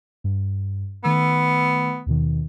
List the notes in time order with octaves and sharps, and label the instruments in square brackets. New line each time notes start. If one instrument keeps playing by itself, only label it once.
[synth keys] G2
[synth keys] D#3 A3 E6 [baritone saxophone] B3
[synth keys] D#2 B2 D#3